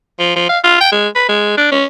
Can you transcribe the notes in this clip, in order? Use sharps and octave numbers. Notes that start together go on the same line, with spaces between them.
F3
F3
F5
F4
G5
G#3
B4
G#3
D4
C#4